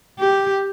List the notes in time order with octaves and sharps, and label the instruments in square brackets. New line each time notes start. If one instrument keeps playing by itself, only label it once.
[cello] G4